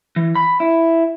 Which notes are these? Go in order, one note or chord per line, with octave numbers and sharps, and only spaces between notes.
E3
B5
E4